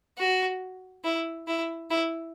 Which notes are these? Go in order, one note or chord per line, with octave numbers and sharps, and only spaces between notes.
F#4
E4
E4
E4